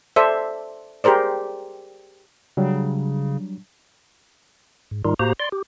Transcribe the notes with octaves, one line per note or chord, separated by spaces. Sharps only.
A4 C5 D5 E5
G4 G#4 A#4 C5 D5
C#3 F#3 G3 D4
G#2
G#2 D#3 G3 D#4 F4
A2 A#3 F#4 G4 C5 A#5
D5 C6
G4